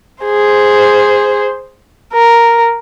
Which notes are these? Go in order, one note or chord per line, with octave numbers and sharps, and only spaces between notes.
G#4 C5
A#4